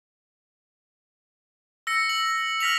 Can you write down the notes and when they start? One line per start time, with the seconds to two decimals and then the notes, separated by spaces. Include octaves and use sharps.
1.87 E6 A#6 C#7
2.09 F#7
2.60 F6 A#6 B6 F7 F#7